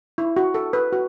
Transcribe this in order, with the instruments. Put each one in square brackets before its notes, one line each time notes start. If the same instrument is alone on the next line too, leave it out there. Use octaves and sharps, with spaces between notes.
[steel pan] E4
F#4
A4
B4
F#4